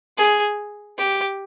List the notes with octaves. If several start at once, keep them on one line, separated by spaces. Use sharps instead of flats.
G#4
G4